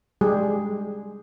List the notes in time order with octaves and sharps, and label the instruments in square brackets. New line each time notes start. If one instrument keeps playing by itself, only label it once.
[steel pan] G3 G#3 G4 G#4